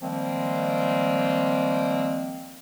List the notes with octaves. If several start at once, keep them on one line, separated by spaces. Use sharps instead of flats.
D#3 F3 G3 G#3 A#3 C4